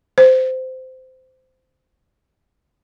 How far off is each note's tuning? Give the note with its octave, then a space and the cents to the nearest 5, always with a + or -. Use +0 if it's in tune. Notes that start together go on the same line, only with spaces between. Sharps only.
C5 -15